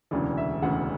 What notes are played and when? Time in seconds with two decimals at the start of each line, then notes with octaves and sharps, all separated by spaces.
0.11 E1 D2 C#3 E3 D5
0.37 E5
0.62 E1 D2 C#3 E3 F#5